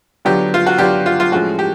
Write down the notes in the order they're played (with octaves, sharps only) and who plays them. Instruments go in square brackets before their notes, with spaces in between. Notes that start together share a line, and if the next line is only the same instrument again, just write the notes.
[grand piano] D3 F#3 B3 D4 F4 [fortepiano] G4
[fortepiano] F4
F#4
[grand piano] D3 F#3 B3 D4 F4 [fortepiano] G4
[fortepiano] F4
F4
[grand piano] A2 F3 G#3 C#4 [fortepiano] F#4
[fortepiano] G4